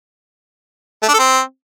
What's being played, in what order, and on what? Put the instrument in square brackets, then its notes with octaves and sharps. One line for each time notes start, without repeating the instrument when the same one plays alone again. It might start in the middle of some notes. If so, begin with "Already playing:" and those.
[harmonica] A3
D4
A4
C4